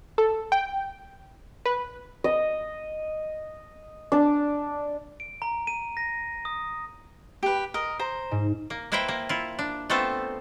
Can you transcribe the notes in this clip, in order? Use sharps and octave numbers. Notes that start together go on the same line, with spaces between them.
A4
G5
B4
D#5
D4
D7
A#5
D#7
A#6
D#6
G4 B4
A#4 D#5
C5 A#5
G#2
A#3
A#3 E4 B4 C5 E5 G5
A#3
E4 F4
D4
A3 B3 C4 F4 A4 C5